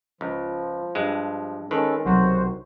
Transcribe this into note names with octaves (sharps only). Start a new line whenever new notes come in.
C#2 F3
G2 G#3
D#3 G#3 C#4 A4 B4
B1 C3 F#3 F#4 C5